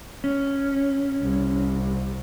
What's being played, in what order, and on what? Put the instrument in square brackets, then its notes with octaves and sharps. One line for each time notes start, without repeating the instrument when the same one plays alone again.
[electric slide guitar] C#4
[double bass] C2